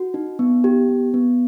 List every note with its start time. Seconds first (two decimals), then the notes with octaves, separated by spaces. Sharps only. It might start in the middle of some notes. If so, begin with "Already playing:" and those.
Already playing: F#4
0.14 D#4
0.39 B3
0.64 G4
0.89 B3
1.14 B3